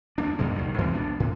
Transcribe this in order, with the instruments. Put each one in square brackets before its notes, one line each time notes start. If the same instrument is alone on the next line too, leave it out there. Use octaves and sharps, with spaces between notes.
[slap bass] D2 A#3 D4
F2 A#2 G3 G#3
C2 D#3
G#2 E3 G#3 C4
B1 B3 D4
A2